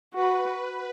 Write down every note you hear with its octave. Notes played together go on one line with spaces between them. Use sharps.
F#4 B4